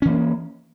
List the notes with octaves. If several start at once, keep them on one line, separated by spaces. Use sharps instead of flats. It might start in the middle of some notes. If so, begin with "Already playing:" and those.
E3 A#3 C#4